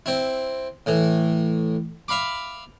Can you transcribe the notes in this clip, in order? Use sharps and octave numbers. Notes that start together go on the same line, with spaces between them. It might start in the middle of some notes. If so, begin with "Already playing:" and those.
C4 E4
A2 E3
E5 F5 B5 D6